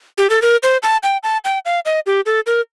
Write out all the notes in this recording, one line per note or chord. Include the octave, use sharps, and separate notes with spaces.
G4
A4
A#4
C5
A5
G5
A5
G5
F5
D#5
G4
A4
A#4